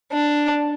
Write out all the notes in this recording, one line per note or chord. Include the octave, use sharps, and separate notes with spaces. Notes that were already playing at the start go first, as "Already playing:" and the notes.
D4